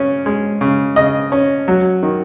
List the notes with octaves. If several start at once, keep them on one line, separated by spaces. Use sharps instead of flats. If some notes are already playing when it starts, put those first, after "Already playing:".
Already playing: C#3 C#4
G#3
C#3
C#3 D#5
C#4
F#3
D#3